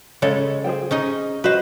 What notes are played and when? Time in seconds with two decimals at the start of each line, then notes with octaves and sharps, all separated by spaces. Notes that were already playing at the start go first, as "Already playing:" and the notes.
0.22 C#3 G#3 A4 C#5
0.64 G#4 C5 G5
0.91 C#4 D#4 D#5
1.44 F#4 B4 C5 D#5